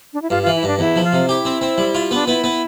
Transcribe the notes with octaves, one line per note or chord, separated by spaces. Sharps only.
D4
E4
G2 F4
E3 F4
E4
G2 D4
E2 E4
F3
F4
C3
E4 G4
C4
C4
G3
F4
B3 D4
B3 E4
B3